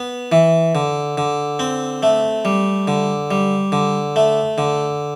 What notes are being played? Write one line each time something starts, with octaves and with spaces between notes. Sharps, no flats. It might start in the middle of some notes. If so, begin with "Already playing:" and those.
Already playing: B3
E3
D3
D3
C4
A3
G3
D3
G3
D3
A3
D3